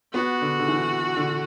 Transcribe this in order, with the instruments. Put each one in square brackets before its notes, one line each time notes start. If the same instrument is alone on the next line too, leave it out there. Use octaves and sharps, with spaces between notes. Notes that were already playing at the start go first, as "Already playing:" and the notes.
[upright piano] B3 [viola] F#4
[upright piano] D3
D3
E3
D3